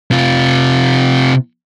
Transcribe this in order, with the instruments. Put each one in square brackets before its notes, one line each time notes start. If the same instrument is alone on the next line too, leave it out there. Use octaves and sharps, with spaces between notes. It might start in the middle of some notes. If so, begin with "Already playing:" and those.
[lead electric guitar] C3 F4